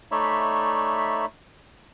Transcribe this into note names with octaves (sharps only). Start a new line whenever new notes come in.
A3 D#4 C#5 D5 E5 B5